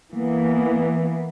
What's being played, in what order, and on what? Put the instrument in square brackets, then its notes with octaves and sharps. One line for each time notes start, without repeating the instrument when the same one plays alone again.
[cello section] E3 A#3 B3